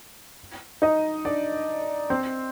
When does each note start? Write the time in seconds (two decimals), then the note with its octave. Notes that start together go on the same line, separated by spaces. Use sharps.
0.82 D#4 D#5
1.25 D4 D5
2.10 C4 C5